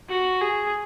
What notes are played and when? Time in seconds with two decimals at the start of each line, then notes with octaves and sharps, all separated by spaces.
0.09 F#4
0.41 G#4